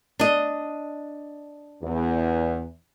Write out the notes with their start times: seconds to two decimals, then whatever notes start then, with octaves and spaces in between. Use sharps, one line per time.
0.19 D4 D#5
1.83 E2